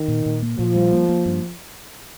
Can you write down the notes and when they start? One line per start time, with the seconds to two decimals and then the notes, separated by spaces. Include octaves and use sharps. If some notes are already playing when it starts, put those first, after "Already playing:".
Already playing: D#3
0.08 A#2
0.26 A#2
0.42 A#3
0.59 A#2 F3
0.75 G3
0.92 A#3
1.09 A#3
1.26 G2